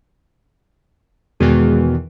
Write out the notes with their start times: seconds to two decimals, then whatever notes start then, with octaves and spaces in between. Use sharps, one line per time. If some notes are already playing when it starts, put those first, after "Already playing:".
1.40 E2 B2 D#3 E3 G#3 B3 F#4